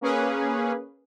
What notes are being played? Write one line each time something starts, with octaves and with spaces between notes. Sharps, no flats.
A#3 C#4 G#4 B4